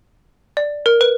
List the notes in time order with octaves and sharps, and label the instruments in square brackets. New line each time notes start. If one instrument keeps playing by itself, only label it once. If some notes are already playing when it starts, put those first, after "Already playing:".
[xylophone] D5
A#4
B4